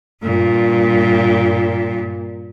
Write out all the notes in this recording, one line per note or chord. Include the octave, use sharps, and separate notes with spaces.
G2 A#2